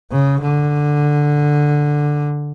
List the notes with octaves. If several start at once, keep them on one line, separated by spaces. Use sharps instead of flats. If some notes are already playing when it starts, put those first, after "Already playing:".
C#3
D3